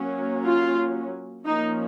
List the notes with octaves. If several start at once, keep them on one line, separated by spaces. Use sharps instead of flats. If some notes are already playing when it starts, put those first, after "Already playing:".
Already playing: F#3 A#3 C#4
F4
F3 A#3 C#4 D#4